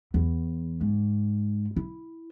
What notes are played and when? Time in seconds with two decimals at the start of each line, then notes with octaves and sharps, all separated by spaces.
0.14 E2
0.81 G#2
1.76 E4